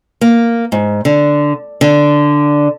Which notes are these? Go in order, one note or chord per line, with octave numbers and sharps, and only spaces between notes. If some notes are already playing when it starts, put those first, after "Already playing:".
A#3
G#2
D3
D3